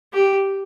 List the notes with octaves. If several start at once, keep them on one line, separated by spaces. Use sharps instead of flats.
G4